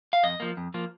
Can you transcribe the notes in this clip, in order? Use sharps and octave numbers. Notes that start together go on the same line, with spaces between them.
F5
F2 D#5
F3 A#3
F2
F3 A#3